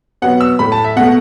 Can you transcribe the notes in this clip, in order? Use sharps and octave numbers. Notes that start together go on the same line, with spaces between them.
B2 F#3 B3 F#5
E6
A2 A3 B5
A5
E5
B2 A3 F#5